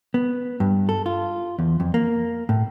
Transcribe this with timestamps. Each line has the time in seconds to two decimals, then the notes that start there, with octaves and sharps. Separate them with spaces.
0.14 B3
0.60 G2
0.89 A4
1.06 F4
1.59 E2
1.80 F2
1.94 A#3
2.49 A2